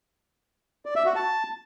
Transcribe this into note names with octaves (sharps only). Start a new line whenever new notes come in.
D5
E5
F#4
A5